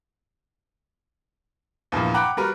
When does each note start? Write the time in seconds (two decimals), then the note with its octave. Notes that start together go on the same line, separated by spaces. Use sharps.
1.92 E2 G2 A#2 F3
2.14 F#5 G5 A#5 B5 D6 F#6
2.37 G3 F#4 A#4 B4